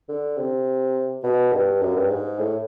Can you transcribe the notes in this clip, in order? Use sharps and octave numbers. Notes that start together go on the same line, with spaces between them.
D3
C3
B2
G2
F#2
G2
G#2
A2